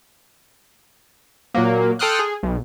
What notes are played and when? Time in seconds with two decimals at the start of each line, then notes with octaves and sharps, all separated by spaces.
1.54 A#2 F#3 A#3
1.99 A4 G5 C6 D#6 F6 F#6
2.19 G#4
2.43 B1